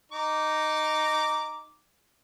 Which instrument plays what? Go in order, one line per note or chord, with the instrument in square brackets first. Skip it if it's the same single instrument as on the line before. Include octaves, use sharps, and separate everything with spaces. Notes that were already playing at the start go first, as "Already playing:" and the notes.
[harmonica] D#4 D6